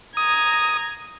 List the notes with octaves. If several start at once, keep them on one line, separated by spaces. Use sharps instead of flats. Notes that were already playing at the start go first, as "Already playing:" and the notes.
A#5 D#6 G#6